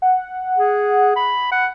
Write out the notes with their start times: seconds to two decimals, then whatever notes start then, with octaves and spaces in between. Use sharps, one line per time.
0.02 F#5
0.58 G#4
1.16 B5
1.52 F#5